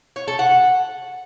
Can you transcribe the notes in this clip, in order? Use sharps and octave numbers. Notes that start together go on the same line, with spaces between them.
C#5
A4
F#5